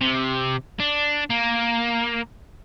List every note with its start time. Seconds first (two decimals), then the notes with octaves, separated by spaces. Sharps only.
0.01 C3
0.80 D4
1.30 A#3